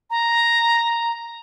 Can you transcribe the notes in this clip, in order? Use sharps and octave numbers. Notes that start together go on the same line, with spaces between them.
A#5